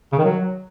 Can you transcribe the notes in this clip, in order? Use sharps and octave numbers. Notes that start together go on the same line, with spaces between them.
C#3
D#3
F#3